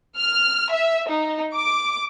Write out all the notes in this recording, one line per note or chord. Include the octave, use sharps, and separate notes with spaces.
F6
E5
D#4
D6